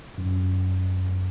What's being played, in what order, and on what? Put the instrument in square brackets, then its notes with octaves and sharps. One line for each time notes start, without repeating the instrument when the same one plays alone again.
[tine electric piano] F#2